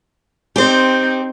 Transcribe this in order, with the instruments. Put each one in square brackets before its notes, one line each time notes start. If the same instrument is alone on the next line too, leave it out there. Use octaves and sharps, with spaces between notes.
[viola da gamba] C4 D#4 [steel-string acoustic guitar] G4 C5